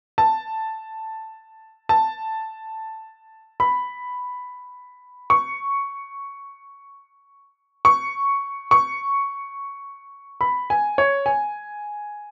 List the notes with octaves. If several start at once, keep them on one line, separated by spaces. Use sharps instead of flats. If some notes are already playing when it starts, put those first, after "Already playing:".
A5
A5
B5
C#6
C#6
C#6
B5
G#5
C#5
G#5